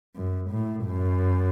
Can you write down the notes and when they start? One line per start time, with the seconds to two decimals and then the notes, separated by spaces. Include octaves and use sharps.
0.16 F#2
0.51 A2
0.87 F#2